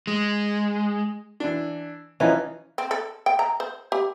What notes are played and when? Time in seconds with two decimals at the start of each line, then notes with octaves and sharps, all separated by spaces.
0.07 G#3
1.40 E3 D4
2.20 E3 F3 C#4 D#4
2.78 C4
2.91 A4
3.26 G5
3.39 A#5
3.60 C5
3.92 G4